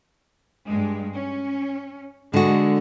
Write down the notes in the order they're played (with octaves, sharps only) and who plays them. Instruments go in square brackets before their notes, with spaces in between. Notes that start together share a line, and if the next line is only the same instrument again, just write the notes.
[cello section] G2 G#3
C#4
[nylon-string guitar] D3 F#4 [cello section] G#3